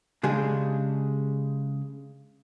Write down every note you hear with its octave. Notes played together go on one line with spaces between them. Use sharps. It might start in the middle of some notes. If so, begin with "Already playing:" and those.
C#3 G#3 D4 G4 G#4